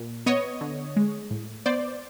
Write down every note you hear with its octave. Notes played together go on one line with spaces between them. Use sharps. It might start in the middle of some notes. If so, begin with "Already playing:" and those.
Already playing: A#2
B3 C#5 D#5
D3
G#3
A2
B3 C5 D5